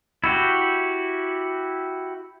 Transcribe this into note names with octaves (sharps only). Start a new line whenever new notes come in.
E4 F#4 G4